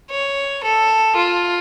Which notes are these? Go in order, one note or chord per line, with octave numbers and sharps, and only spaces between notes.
C#5
A4
F4